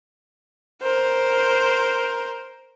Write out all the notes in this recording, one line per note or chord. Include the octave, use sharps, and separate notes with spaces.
A#4 C5